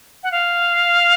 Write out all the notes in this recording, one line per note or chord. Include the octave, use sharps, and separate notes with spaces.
F#5
F5